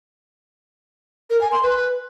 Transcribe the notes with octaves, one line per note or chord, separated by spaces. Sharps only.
A#4
G#5
C6
B4